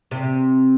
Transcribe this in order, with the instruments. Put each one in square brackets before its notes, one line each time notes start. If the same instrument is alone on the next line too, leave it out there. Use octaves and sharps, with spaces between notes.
[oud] C3